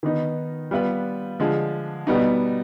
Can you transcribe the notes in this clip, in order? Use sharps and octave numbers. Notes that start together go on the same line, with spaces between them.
D#3 B3 D#4 B4
G3 B3 F4 B4
D3 F3 G#3
B2 G3 B3 D#4